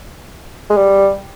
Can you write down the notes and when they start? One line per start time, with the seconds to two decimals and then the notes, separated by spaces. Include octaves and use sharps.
0.70 G#3
0.76 G3